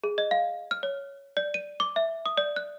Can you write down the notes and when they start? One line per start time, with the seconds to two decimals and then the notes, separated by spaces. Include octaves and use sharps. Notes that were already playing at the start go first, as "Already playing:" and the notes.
0.04 G#4
0.18 D#5
0.31 F5
0.71 F6
0.83 C#5
1.37 D5
1.54 D#7
1.80 D6
1.96 E5
2.26 D#6
2.38 D5
2.56 F#6